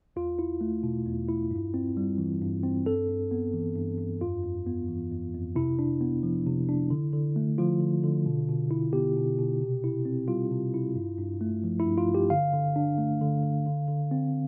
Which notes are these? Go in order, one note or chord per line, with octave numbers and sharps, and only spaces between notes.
E2 F4
E4
A3
B2
E2
E4
G2
C4
G3
E3
G2
C4
G2 A4
G2
B3
E3
G2
G2
F2 F4
F2
B3
E3
F2
F2
C3 E4
D4
B3
F3
C3
D4
D3
D3
A3
F3 F4
D3
D3
B2
B2
E4
B3 G4
B2
B2
C3
E4
C4
G3 F4
C3
E4
G2
G2
A3
F3
E4
G2
F4
G2
G4
D3 F5
D3
D4
A3
D3
D3
D3
D3
C4